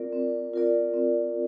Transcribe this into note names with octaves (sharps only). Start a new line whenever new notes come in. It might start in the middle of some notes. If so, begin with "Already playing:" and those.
Already playing: C4 F4 A#4 D5
C4
F4 A#4 D5
C4